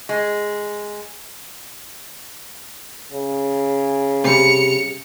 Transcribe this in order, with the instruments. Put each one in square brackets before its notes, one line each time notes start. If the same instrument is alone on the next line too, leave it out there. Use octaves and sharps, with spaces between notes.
[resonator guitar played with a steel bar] G#3
[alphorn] C#3
[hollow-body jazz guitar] C3 G3 [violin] C#7 F7